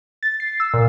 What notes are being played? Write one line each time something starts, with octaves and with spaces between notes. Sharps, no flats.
A6
C7
E6
A#2